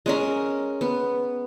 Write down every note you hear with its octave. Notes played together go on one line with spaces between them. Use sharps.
G#3 C#4 A#4
B3